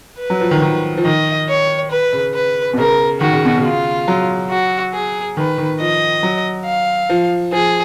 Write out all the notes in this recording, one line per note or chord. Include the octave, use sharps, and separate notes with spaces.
B4
F#3
F3
D#3
D#3
F3
D#3 D#5
C#5
B4
C#3
B4
B2
C#3 A#4
D#3 F#4
C#3
B2
C#3
F4
F#3
F#4
G#4
D#3 B4
D#3
F3 D#5
F#3
F5
F3
F3 G#4